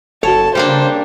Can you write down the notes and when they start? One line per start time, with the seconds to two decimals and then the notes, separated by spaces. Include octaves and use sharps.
0.23 F#1 F#4 A4 C#5 A5
0.55 C#3 G3 A#3 D4 C5